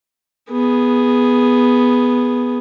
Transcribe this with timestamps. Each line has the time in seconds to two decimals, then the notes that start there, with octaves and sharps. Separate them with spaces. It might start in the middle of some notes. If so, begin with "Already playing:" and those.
0.50 B3 G#4